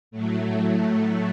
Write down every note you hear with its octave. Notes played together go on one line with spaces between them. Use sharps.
A2 F#3 A3